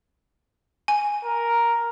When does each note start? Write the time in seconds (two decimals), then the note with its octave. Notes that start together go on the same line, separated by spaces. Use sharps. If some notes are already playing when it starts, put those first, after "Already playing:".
0.88 G#5
1.25 A#4